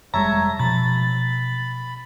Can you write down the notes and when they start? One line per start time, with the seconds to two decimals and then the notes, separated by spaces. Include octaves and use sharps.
0.14 F1 G3 G#3 C#5 E5 A5 A#5
0.60 B2 F3 B5 A6